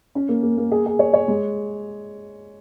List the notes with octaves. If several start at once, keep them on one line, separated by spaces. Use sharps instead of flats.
C#4
A#3
A#3
A#3
G#4
G#4
C#5
C#5
G#3